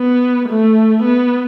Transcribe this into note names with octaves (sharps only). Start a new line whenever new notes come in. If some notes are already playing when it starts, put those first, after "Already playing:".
Already playing: B3
A3
B3